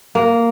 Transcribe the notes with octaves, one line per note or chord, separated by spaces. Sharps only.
A#3